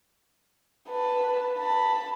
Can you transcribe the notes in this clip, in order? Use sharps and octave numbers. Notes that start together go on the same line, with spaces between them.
B4 A5
A5 B5